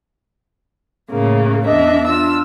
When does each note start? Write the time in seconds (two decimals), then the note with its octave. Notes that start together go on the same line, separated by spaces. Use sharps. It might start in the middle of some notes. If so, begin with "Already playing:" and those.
1.11 A2 C#3 A#3
1.67 E2 D4 D#5 E5
2.08 D4 F4 E6